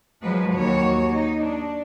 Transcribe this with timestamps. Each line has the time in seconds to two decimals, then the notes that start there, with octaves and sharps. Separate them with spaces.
0.23 F3 F#3 G#3 B4
0.53 D#2 F#4 C#5
1.10 D#4
1.43 D4